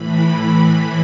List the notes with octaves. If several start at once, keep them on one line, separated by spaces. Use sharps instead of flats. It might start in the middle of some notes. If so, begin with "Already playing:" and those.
Already playing: A2 E3 B5
A2 E3